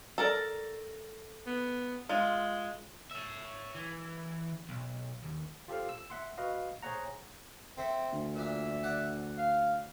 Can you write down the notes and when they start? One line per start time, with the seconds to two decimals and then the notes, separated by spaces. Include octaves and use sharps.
0.18 A4 A#4 D5
1.46 B3
2.09 G#3 F4
3.11 C#5 E5
3.75 E3
4.69 B1
5.23 D#2
5.68 F4 G4 A4 C5 F5
5.89 E6
6.10 E5 F#5 C6
6.38 F#4 B4 D#5 F5
6.83 G#4 C5 C#5 F#5 A#5
7.78 C4 A4 E5
8.12 D2
8.36 A#2 D4 E5
8.83 D5 F#5
9.38 F5